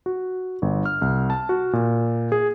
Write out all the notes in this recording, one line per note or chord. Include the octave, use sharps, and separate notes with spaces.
F#4
G1
F6
C2
A5
F#4
A#2
G#4